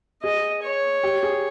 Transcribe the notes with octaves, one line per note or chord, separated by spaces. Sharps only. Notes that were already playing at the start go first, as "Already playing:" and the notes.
G#4 D#5
C#5
G4
G#4